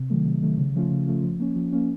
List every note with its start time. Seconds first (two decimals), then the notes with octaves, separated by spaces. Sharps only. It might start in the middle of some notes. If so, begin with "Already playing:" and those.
Already playing: C3
0.10 D#3 F#3 A3
0.25 C3
0.42 D#3 F#3 A3
0.58 C#3
0.75 F3 A3 C#4 F4
0.91 C#3
1.07 F3 A3 C#4 F4
1.24 F3
1.40 A#3 C#4
1.55 F3
1.73 A#3 C#4